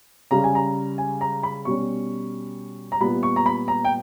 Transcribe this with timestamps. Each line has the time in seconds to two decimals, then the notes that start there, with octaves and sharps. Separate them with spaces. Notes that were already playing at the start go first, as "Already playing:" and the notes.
0.31 C#3 G3 C#4 A#5
0.44 G#5
0.55 A#5
0.98 G#5
1.21 A#5
1.43 B5
1.65 B2 G3 C#4 C#6
2.92 A#5
3.01 A#2 G3 B3 B5
3.23 C#6
3.36 A#5
3.46 B5
3.68 A#5
3.84 G5